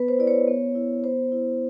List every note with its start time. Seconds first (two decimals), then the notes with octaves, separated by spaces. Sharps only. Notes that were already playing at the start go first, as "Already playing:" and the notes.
Already playing: B3 B4
0.08 C5
0.19 E4 D5
0.27 C#5
0.47 B3
0.75 E4
1.04 B3 C5
1.32 E4